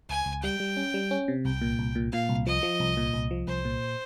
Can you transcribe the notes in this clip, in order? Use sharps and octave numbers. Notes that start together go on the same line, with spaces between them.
C#2 G#5
C#2
G3 G5
G3
C#4
G3
C#4
C3
C2 G5
A#2
C2
A#2
A#2 F5
C2
F3 D#5
F3
C2
A#2
C2
F3
C2 C5
A#2